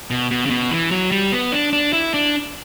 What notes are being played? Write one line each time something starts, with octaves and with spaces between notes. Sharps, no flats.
B2
B2
C#3
B2
E3
F#3
G3
B3
D4
D4
E4
D4